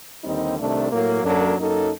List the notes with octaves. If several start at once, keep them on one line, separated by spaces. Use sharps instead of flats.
D#2 D3 G3 C4 D#4
C2 C3 D#3 A3 D4
A2 F#3 A#3
F#2 F#3 A#3 D4 A4
F#2 F#3 A#3 D#4 A4